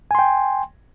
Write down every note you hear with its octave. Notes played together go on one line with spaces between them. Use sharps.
G5 G#5 C6